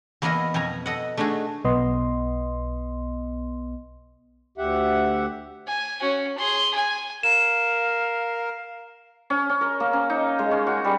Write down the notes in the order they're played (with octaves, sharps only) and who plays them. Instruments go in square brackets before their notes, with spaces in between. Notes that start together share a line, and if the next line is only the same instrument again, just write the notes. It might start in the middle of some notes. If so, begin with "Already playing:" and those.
[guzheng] E2 A#3 B3 E4 A#4 D#5
F2 B2 G#5 A#5
A4 D#5 F#5
A3 D4 D#4 F#4 G#4
[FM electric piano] B1 B3 D#5 C6
[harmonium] D2 G4 E5 F#5
[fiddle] G#5
C#4 F#4
G#4 C6
G#5
[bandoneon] A#4 [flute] F5 [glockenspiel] E7
[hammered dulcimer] C#4
C#4
A#4
A#3
C#4
D#4
G#3
C#4
F#4
G3